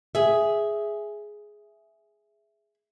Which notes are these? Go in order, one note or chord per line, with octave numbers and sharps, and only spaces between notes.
G#4 E5